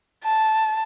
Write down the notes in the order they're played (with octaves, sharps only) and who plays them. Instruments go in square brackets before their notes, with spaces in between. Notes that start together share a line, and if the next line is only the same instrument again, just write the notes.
[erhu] A5